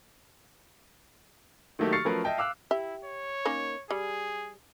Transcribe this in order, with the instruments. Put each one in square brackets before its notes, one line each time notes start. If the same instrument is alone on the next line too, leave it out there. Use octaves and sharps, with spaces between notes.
[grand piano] D#3 F#3 A3 A#3 G4
C#6 F6 A6 C7 C#7
F3 F#3 A3 C#4 A#4 B4
D#5 E5 G5 A5
F5 D6 E6 F#6
[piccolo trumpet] E4 [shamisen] G4 E5
[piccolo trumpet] C#5
[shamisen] A#3 C#4 D#4
[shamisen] G3 [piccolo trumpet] G#4